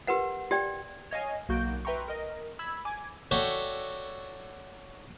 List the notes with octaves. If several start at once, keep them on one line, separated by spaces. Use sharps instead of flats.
G4 A#4 B4 F#5
G4 D5 G5
C#5 D#5 F5 G#5
B1 A#3 F#4 G6 D7
B4 E5 G5 A#5 C6 C#6
A#4 D#5
B5 E6 G#6
G#5 D6 G#6
F#4 A4 C#5 D5 E5 G5